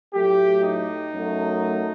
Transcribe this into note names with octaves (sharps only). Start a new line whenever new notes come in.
A2 F#3 A3 G4
D#4
F#2 F#3 A3